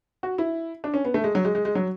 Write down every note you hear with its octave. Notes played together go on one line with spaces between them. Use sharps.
F#4
E4
D4
C#4
B3
A3
G#3
F#3
G#3
G#3
G#3
F#3